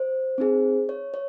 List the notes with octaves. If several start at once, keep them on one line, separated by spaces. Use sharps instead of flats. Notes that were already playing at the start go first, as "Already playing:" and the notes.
Already playing: C5
C4 D#4 G#4
C#5
C#5